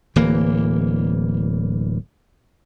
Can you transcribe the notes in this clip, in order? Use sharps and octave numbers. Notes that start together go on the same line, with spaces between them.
D1 E3 A#3